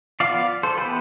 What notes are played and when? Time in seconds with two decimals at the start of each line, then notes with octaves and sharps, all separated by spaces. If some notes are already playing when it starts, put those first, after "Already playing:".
0.20 F3 B3 D5 F5
0.63 A4 C5
0.78 E3 B3 G4 B4